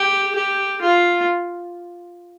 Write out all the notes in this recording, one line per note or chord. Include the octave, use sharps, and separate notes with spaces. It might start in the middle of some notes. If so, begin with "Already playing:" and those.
Already playing: G4
G4
F4